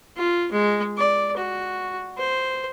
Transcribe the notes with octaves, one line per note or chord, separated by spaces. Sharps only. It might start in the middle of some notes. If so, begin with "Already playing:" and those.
F4
G#3
D5
F#4
C5